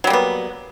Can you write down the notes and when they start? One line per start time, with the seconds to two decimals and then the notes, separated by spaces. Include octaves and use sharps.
0.04 F#3
0.07 G3
0.10 A#3
0.13 B3